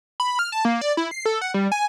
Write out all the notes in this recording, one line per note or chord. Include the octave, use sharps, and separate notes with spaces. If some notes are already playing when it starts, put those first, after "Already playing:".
B5
F6
A5
A#3
D5
E4
C7
A4
F#5
G3
G#5